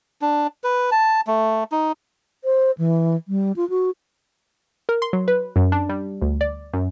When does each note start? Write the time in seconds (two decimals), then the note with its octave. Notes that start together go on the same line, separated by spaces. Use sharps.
0.22 D4
0.64 B4
0.91 A5
1.27 A3
1.72 D#4
2.44 C5
2.78 E3
3.28 G3
3.56 F4
3.70 F#4
4.89 A#4
5.02 C6
5.13 F#3
5.28 B4
5.56 F#2
5.72 D4
5.89 G3
6.22 D2
6.41 D5
6.74 F#2